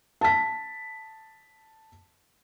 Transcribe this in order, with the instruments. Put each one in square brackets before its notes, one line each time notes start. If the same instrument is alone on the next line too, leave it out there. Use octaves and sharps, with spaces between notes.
[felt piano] A5 B6